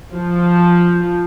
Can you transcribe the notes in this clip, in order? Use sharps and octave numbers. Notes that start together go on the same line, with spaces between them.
F3